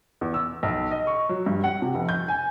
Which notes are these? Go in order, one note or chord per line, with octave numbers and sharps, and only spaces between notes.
E2
E6
B1
D#5
C#6
F#3
G2
F#5
C3
F1
G6
G#5